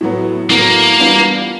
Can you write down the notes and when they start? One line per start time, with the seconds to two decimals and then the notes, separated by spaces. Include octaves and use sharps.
0.01 A2 F#3 B3
0.50 A2 F#3 A#3 B3
0.99 E3 G3 B3 D4 F4